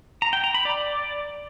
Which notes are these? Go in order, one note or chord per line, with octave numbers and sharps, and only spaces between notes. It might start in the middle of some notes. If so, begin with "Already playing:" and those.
A#5
G5
A#5
B5
D5